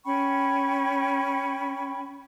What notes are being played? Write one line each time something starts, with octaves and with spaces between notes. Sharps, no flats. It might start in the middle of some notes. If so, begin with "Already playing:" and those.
C#4 G5 B5 C#6